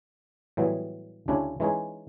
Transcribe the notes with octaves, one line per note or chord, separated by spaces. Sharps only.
A2 E3 F#3 G3 B3
D2 C#3 C#4 D4 E4 G4
E3 G#3 C#4 D#4 G#4